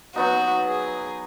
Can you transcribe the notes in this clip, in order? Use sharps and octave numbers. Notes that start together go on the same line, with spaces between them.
F#3 B3 D#4 F#4
G#4